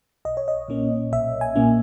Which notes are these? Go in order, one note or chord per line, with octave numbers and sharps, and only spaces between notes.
B1 D#5
C#5
D#5
A#2 A#3 C#4
B1 E5
G#5
A#2 A#3 C#4